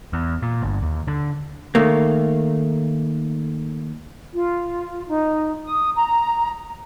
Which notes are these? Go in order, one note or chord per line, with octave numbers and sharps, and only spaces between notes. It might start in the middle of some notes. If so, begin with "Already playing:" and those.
E2
A#2
G1
D#2
D3
D#3 A3 A#3
F4
D#4
D#6
A#5